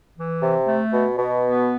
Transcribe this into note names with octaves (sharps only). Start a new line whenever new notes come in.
E3
C3
A3
B2
B2
B3